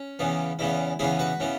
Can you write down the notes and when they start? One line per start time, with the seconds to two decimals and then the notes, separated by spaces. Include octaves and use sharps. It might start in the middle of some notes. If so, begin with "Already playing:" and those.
Already playing: C#4
0.19 E2 C#3 E3 B3
0.59 E2 C#3 E3 B3 E4
0.99 E2 C#3 E3 B3 E4 G#4
1.19 F#4 B4
1.40 C#3 E3 B3